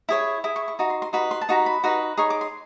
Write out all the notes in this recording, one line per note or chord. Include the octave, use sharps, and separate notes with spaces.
E4 G#4 C#5
E4 G#4
C#6
C#6
D#4 F#4
C6
C6
D#4 F#4 B4 B5
C6
A5
D#4 F#4 B4 A#5
B5
D#4 F#4 B4
D#4 G#4 C#5 C#6
D6
C6